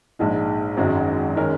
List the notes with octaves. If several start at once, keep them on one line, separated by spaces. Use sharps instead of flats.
A#1 G#2 G#3 D#4
G#1 F#2 D#3 G#3 F#4
D#3 G#3 C#4 A#4